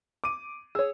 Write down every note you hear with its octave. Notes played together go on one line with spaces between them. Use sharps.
D6 D#7
G#4 C#5 E6